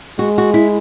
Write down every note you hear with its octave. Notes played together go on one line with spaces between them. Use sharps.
G#3 F#4
F#4
E4